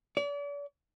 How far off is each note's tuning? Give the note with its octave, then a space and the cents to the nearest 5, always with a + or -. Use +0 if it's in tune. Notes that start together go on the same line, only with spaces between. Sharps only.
D5 -40